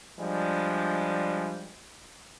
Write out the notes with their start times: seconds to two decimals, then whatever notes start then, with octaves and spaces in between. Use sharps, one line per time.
0.20 F3 G3 G#3 D4